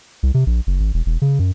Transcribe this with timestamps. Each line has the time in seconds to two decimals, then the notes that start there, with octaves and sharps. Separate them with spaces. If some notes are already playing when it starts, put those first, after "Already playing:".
0.23 C2
0.34 C3
0.47 A#1
0.67 F#1
0.80 G#1
0.94 E1
1.06 E1
1.22 C#3
1.39 F#2